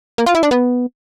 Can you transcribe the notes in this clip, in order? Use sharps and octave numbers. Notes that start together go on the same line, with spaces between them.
A#3
F4
E4
D4
B3